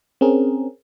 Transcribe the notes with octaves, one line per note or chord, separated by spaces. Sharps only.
C4 C#4 G#4 A#4